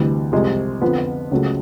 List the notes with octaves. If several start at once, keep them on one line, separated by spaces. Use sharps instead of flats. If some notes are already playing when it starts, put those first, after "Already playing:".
Already playing: D2 C3 E3 G3
C2 C3 F3 G#3
F2 D3 F3 B3
C#2 C#3 F#3 A3